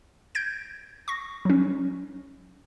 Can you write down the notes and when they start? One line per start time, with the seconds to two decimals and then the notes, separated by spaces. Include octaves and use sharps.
0.35 G6 G#6 D7
1.08 C#6 A#6
1.45 F#3 C#4